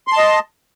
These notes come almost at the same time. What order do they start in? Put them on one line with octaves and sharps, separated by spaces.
C6 A5 D#5